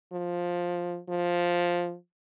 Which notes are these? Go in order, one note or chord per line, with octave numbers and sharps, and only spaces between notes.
F3
F3